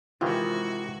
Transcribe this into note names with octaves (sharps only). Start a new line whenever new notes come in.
C3 D#3 E3 G#3 F4 F#4